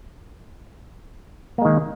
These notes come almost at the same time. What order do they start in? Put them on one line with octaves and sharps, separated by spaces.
A#3 G#3 D#3